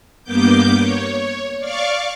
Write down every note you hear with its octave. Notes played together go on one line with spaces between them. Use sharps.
G2 A#3 B3 D6 G6
C#5
D5 F5 C#6 D6